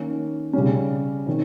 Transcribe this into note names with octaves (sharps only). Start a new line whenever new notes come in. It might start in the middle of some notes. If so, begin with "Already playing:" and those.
Already playing: D#3 A#3 C#4
C#3 G3 C#4
C3 D#3